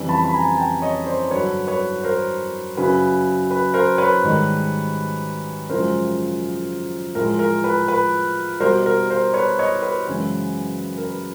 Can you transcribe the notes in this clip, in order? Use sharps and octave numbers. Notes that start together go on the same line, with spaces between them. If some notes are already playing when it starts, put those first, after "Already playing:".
Already playing: F2 C#3 E3 G3
A5 B5
B5
G#5 A#5
G5 A5
C#5 D#5
C5 D5
G2 D3 F#3 B4 C#5
B4 C#5
A#4 C5
F#2 C#3 F#3 B4
B4
A#4 C5
B4 C#5
G#2 D#3 G3
F#2 C#3 F3 G#3 A#4 C5
A2 F3 G#3 A#4
A#4
B4
B4
B2 G3 A#4 C5
A#4
A#4 C5
B4 C#5
C#5 D#5
B4
F#2 C#3 E3 G#3 B4
A#4
B4